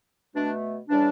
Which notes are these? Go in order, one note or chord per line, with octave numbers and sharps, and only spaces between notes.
B2 A3 D4
C#3 E3 G3 D4